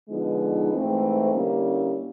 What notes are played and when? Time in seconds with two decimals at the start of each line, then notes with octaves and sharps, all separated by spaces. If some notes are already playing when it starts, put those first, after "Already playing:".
0.09 D3 F3 G#3 B3 D#4
0.71 G#2 E3 A3 C4
1.34 D3 G3 A#3 C#4 E4